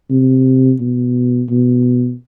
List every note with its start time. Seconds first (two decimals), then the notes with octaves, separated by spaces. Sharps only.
0.10 C3
0.80 B2
1.50 B2